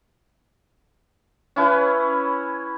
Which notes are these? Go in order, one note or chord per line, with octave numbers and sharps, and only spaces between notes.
C#4 E4 B4